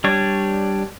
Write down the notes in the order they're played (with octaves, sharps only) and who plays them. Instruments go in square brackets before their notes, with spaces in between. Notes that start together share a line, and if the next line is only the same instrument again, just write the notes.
[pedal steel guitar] G3 D4 C#5